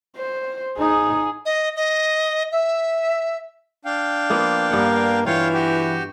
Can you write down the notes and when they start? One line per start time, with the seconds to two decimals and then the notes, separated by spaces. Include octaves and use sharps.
0.16 C5
0.78 D#4 G#4
1.45 D#5
1.76 D#5
2.52 E5
3.85 D4 F5 G5
4.30 F3 A#3 B3
4.71 G2 A#3 B3 F#5
5.26 E3 F4 C#5 F5 G5
5.54 F#4 G4 G5